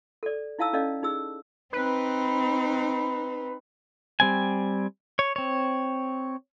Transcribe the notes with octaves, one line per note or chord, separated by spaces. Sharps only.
A4 D5
D#4 E4 F5 A5 E6
C#4 A4 D5 D#5 F5
D#4 G#4 E6
C4 D#4 B4
G3 C4 G#5
C#5
C4 C#5